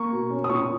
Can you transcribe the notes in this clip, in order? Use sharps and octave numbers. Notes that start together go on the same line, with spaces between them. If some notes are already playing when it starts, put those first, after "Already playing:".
Already playing: A#3 C#6
B2
C#4
D#6
A#2 C#6